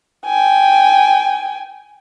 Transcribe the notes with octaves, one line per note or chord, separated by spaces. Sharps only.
G5 G#5